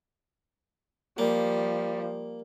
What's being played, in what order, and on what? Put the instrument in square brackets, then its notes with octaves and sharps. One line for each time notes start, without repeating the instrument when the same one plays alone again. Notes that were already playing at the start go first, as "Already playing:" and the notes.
[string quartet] F3 G3 [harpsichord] A#3